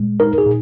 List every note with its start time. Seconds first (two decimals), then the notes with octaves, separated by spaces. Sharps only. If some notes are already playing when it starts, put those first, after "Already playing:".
Already playing: A#2 G#3
0.20 D#4 A#4
0.38 G#4
0.46 A#2